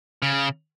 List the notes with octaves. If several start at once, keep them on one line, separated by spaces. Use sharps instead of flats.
C#3